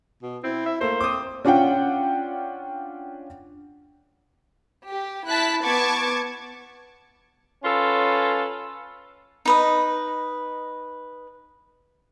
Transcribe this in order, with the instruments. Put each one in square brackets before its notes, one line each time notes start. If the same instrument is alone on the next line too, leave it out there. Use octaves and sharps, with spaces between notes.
[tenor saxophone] B2
[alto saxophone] C4 [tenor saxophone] E4
[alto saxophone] E5
[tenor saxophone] A3 [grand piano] A#3 [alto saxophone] C5
[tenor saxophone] C4 [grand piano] D6 D#6
[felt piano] C#4 D4 F4 F#5 G5
[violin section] G4
E4 A5 F#6 B6
B3 A5 C#6 D6 G#6
[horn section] C#4 F4 A4 B4
[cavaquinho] D#4 B4 D#5